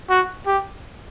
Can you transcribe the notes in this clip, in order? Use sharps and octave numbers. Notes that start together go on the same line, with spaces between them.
F#4
G4